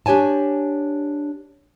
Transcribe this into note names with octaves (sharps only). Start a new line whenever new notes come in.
D4 G4 C#5 G#5 A5